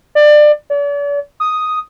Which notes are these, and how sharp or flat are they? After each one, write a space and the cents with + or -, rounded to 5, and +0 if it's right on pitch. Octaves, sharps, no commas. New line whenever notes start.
D5 +25
D5 -45
D#6 +0